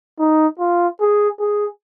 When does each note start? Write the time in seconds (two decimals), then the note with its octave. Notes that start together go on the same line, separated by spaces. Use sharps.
0.19 D#4
0.59 F4
1.01 G#4
1.40 G#4